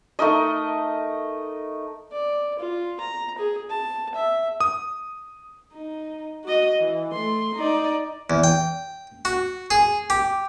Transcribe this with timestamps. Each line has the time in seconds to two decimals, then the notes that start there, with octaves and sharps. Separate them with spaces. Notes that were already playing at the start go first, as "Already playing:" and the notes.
0.19 A3 D#4 A#4 D#5
2.12 D5
2.59 F4
3.00 A#5
3.38 G#4
3.70 A5
4.15 E5
4.60 D#6
5.73 D#4
6.44 F#4 D#5
6.80 E3
7.13 A3 C6
7.55 D#4 D5
8.30 E2
8.44 G5
9.25 F#4
9.71 G#4
10.10 G4